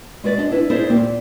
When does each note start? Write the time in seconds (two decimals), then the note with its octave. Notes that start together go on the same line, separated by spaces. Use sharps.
0.24 G#3 F#4 B4 D5
0.38 D4 D#5
0.51 D4 E4 B4
0.70 D#4 E4 G#4 A#4 C5 D5
0.89 D2 A#2 A#3 C4 G4
1.00 A#2